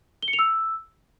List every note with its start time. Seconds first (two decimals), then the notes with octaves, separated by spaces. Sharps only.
0.22 G7
0.28 C#7
0.33 F7
0.39 E6